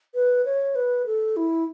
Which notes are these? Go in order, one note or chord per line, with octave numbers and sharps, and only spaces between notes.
B4
C#5
B4
A4
E4